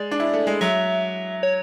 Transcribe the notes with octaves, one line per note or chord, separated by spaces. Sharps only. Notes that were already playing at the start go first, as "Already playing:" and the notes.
Already playing: G#3 D5
D4
E4
A3
G#3
F#3 E5
C#5